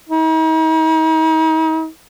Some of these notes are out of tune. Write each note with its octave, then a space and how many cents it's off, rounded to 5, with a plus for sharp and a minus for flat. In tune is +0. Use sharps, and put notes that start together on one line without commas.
D#4 +40